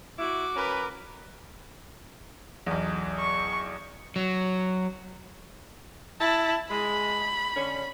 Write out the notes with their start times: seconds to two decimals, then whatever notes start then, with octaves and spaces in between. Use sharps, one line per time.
0.19 E4 F#4 D6
0.56 C#4 A#4 B4
2.66 B1 E2
3.18 C#6
4.16 F#3
6.20 E4 A5
6.70 G#3 B5
7.56 D3 C#4